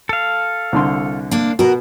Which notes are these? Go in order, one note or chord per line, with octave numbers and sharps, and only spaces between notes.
A4 F5
C2 D3 C6
A#3 D4
B2 F#4 A#4